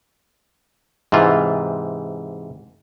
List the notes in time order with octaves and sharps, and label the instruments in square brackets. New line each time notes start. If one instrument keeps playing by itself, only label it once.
[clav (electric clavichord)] G#2 C3 E3 F4